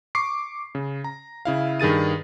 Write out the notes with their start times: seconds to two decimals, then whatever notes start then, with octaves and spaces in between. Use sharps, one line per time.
0.15 C#6 D6 C7
0.75 C#3
1.04 A#5
1.45 C#3 E4 F5
1.80 G2 D#3 G#4 A6 D#7